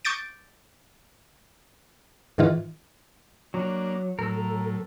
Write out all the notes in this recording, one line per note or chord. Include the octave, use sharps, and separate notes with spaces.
C#6 D6 G6 A6 D7
G#2 D#3 E3 F4
F#3 A#3 D4
A2 F#3 A4 A#4 E6